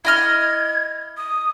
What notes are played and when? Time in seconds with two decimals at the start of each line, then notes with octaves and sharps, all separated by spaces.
0.05 E4 D#5 F6 G#6
1.17 D#6